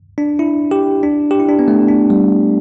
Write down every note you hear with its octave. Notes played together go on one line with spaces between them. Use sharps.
D4
E4
G4
D4
G4
E4
D4
B3
A3
D4
G3